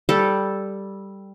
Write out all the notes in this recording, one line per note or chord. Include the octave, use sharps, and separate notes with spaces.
G3 A4